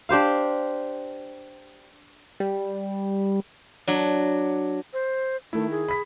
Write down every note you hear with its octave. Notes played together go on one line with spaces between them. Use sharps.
D4 G4 C5 F5
G3
F#3 D4
C5
D#3 A3 E4
G#4
B5 B6